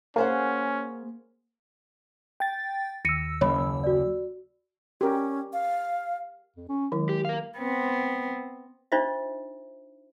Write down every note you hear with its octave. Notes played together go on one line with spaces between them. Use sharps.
A#3 C#4 G#4 C5 F#5
G5 A6
D#2 E6 A#6 C#7 D#7
F#1 C#5 B5
F#4 D5
C#4 G4 A#4
F5
F2
C#4
D#3 F#3 G#3 E4
G4
A#4 F5
B3 C4
D4 D#4 F4 C5 D#5 E5